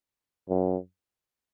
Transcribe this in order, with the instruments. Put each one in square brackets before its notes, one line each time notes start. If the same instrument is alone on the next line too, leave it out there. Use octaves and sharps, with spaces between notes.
[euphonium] F#2